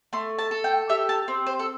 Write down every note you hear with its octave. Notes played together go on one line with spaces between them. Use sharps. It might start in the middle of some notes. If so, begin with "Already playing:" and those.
A3 C6
A5
A4
G5
G4 E5
A5
C4
C5
A4